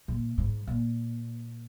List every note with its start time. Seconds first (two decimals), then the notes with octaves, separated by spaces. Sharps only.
0.08 A#2
0.38 G#2
0.67 A#2